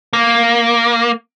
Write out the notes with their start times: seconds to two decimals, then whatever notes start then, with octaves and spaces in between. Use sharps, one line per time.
0.13 A#3